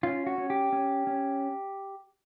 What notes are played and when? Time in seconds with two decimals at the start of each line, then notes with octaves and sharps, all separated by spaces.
0.03 C#4 F4
0.27 F#4
0.38 C#4
0.50 G4
0.73 C#4
1.07 C#4